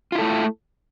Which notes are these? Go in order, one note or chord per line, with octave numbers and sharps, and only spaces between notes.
A3 E4 F4 A4